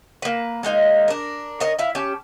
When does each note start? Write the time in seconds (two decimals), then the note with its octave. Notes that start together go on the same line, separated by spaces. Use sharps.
0.22 A#3 B4
0.63 G#3 A#3 D#4 F5
1.08 D4 A#4
1.60 A#4 C#5 D#5
1.79 E4 E5 F5
1.95 C#4 G4 A5